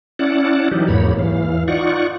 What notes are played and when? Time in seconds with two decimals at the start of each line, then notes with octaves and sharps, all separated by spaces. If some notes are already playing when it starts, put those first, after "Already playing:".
0.19 C#4 E4 D5 F#5 A5
0.71 E3 F#3 D#4 G4
0.88 E2 G#2 A#3 C#5 B5
1.18 E3 F5
1.68 D#4 F4 D5 F#5 C#6